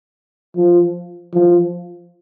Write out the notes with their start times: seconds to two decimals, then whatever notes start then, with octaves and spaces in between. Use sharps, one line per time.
0.57 F3
1.34 F3